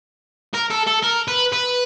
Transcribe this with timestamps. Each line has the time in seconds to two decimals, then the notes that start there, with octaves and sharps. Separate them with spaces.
0.54 A#4
0.70 A4
0.87 A4
1.03 A#4
1.28 B4
1.53 B4